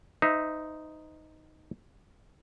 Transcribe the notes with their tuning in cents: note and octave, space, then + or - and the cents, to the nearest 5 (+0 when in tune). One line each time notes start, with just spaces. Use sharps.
D#4 +0 C5 -40 E5 -5